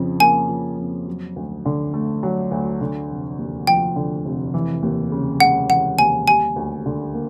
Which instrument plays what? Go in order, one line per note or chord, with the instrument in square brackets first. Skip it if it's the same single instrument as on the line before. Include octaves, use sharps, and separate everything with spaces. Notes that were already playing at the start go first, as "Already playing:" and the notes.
Already playing: [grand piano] F2 C#3 F3
[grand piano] A#3 [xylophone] G#5
[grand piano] F3
F2
F#3
D2
D3
A3
F#3
D2
D3
F1
D#2
[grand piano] F3 [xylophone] G5
[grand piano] D3
F1
E3
D#2
C#3
[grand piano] G#3 [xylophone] F#5
[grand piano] E3 [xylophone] F#5
[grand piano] D#2 [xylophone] G#5
[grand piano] G3 [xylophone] G#5
[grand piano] D2
D3
A#3